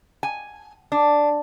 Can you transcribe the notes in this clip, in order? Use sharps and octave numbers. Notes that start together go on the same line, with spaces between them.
G#5
D4